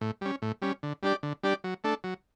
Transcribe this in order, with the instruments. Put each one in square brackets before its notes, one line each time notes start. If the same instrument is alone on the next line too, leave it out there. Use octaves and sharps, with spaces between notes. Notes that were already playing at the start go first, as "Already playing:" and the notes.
[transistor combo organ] A2
G3 C#4
A2
G3 C#4
D3
G3 D4 G4 D5
D3
G3 D4 G4 D5
F#3
A3 D4 A4
F#3